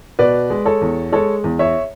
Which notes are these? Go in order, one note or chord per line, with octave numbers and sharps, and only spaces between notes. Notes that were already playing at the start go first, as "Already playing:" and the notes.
B2 B4 D5
G#3
A4 C#5
E2
G#3 A4 C#5
E2
C#5 E5